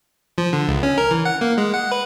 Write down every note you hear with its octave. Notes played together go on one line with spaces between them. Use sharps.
F3
D3
C#2
C#4
A#4
E3
F#5
A#3
G#3
F#5
B4